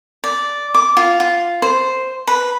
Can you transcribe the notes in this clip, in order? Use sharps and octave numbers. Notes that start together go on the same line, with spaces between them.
D5
D6
F4
F4
C5
B4